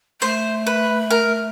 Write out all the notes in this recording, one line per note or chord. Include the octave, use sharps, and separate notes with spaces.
A3 C5
B4
A#4